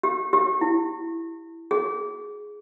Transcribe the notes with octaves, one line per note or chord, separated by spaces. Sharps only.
G4
G4
E4
G#4